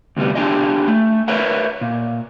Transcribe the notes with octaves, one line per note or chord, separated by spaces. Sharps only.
D2 C3 G3 B3
D4 F4 G4 G#4 D#5
A3
A#4 B4 C#5 E5 F#5
A#2